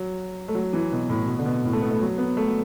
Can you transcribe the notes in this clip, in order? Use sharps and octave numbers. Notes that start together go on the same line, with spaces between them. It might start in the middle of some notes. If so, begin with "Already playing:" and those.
Already playing: F#3
A3
F#3
E3
B2
A2
B2
D3
B2
A2
A3
B3
A3
F#3
B3
A3
F#3